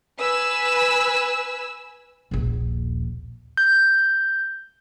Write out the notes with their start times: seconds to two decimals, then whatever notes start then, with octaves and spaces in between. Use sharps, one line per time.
0.19 B4 G#5 E6
2.31 D#1 A#1
3.57 G6